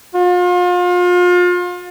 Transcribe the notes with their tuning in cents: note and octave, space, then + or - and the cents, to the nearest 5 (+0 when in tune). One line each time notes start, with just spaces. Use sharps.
F4 +35